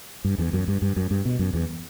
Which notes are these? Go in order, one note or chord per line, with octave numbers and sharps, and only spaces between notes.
G2
E2
F#2
G2
G2
F#2
G2
B2
F#2
E2